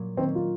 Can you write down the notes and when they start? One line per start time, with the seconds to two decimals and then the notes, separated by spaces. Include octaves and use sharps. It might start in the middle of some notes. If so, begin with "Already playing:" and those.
Already playing: A#2 F#3
0.17 D#3 A#3 C4 C#4
0.35 F4